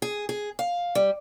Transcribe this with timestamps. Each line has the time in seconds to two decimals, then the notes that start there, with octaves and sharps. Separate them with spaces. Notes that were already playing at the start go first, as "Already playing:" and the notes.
0.02 G#4
0.29 G#4
0.59 F5
0.95 G3